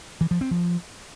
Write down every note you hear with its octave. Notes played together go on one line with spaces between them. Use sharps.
E3
F3
C4
F3